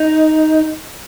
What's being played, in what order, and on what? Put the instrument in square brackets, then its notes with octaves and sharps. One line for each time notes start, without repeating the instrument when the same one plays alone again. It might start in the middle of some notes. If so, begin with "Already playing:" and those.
Already playing: [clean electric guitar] D#4